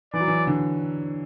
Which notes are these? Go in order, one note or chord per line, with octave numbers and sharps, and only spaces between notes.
E3 D5
F#3
E3
D3